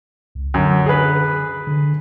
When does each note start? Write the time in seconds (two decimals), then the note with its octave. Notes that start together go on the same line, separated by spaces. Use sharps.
0.35 C#2
0.54 F#2 D3
0.86 G#4 B4
1.67 D3